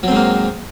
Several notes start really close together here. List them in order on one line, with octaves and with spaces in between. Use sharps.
F#3 C4 G#2 A#3